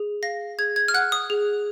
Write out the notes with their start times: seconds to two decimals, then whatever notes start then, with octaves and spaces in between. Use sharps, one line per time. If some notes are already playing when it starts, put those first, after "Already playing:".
Already playing: G#4
0.23 F5 A#6
0.59 G#4 G#6
0.76 G#6
0.88 F6
0.94 F#5 F#6
1.12 D#6
1.30 G#4